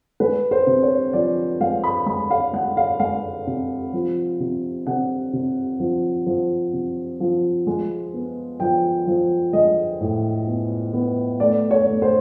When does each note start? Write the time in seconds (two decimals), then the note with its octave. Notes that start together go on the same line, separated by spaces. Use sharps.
0.20 G#3 B4
0.51 C5
0.67 C3
0.83 C#5
1.13 F3 D5
1.60 G#3 F5
1.84 B5
2.06 G#3 B5
2.31 F5
2.53 G#3 F#5
2.77 F5
3.00 G#3 F5
3.47 C3
3.93 F3
4.40 C3
4.87 C3 F#5
5.33 C3
5.80 F3
6.26 F3
6.73 C3
7.20 F3
7.67 G#3
8.13 B3
8.60 F3 G5
9.07 F3
9.53 G#3 D#5
10.01 A2
10.47 B3
10.93 B3
11.40 A3 D5
11.71 C#5
11.87 A3
12.02 C5